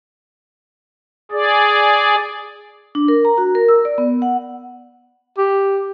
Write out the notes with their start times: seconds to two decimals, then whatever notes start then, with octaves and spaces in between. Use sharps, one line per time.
1.32 G#4 D5
2.95 D4
3.08 A#4
3.25 A#5
3.38 F#4
3.55 A#4
3.68 E6
3.85 D5
3.98 B3
4.22 F#5
5.38 G4